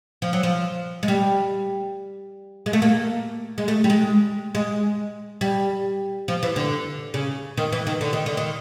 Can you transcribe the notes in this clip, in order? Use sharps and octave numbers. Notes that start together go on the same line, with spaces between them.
F3
F#3
F3
G#3
G3
G#3
A3
A#3
G#3
A3
G3
G#3
G#3
G3
F3
E3
D3
C#3
D#3
E3
D#3
D3
D#3
D3
D#3